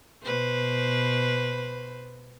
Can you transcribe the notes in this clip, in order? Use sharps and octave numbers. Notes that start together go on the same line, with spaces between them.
B2 B4 C5